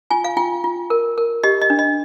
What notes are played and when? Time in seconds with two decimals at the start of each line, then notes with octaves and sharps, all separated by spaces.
0.10 F4 G#5
0.24 F5
0.37 F4 G5
0.64 F4
0.90 A#4
1.18 A#4
1.43 G4 D#5
1.61 D#5
1.70 D4
1.79 D#5